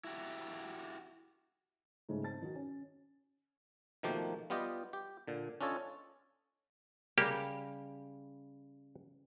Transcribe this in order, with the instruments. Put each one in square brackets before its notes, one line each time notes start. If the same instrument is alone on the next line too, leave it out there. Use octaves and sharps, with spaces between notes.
[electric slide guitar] E4 F#4 G4
[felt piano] G#2 C#3 A3 C#4
C4 A5 A6
D#3 D#4 F#4
C#4
[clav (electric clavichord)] B2 D#3 F3 A3 A#3 G4
G3 B3 F4 G4 D#5
G4
A#2 D3
C#4 D4 F4 A4 C#5 D#5
[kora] C#3 G3 [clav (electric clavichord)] A#3 G4